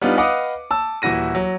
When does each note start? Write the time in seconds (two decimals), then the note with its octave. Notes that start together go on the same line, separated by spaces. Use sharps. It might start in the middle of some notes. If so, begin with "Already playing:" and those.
0.02 G3 B3 D4 D#4 F4
0.17 B4 D#5 F5 F#5 D6 D#6
0.71 A5 E6
1.02 D#1 E3 E4 F#4 A#6 D#7
1.35 F#3